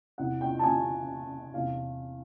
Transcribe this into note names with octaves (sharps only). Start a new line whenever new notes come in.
E2 C3 E3 F#5
G5
A5
G#5
E2 C3 E3 F5